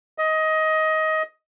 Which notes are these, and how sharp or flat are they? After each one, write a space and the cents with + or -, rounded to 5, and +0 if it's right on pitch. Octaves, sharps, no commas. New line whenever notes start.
D#5 +15